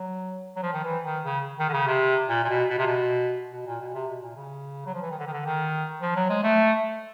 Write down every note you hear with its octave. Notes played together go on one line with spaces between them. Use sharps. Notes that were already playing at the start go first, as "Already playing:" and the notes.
Already playing: F#3
F#3
F3
D#3
E3
D#3
C#3
D#3
D3
C#3
C3
A#2
A#2
B2
B2
C3
B2
B2
A#2
B2
C3
B2
A#2
C#3
F#3
F3
E3
D#3
D3
D#3
D3
D#3
F3
F#3
G#3
A3